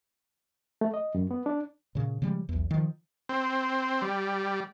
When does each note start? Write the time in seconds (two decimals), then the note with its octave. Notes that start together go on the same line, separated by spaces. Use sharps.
0.81 A3
0.94 D#5
1.15 F#2
1.31 B3
1.46 D4
1.95 A#2 C#3
2.22 C#3 F3 G3 G#3
2.49 B1 E2
2.71 D#3 F3
3.29 C4
4.02 G3